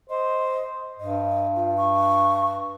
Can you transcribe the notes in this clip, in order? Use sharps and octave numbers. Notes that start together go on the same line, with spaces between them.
C5 D#5
G2 D#5
F4
C#6